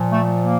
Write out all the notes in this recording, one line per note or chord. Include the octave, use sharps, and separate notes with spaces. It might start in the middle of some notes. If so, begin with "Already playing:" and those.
Already playing: A#2 F3
A3
A#3